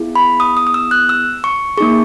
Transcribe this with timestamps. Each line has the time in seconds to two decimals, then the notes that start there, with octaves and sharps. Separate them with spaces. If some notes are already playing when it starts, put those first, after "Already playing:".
Already playing: B3 E4 G#4
0.16 B5
0.40 D#6
0.57 D#6
0.67 D#6
0.74 E6
0.91 F#6
1.09 E6
1.44 C#6
1.78 A#3 D#4 G#4 C#6